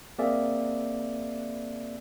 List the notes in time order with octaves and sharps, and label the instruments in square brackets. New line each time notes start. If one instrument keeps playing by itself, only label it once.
[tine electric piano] A#3 C4 G#4 D5 E5 G#5